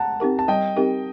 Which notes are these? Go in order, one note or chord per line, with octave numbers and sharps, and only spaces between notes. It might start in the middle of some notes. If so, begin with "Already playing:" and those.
Already playing: F#5 A5 A#5
C4 D#4 G4 A#4
A5
G3 D#5 G5
C4 D#4 G4 A#4